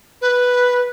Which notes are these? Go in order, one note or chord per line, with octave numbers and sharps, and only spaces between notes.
B4